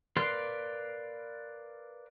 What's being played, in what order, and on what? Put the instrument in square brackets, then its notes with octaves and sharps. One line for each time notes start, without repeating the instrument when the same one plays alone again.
[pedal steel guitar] A#4 B4 D5 F5 C6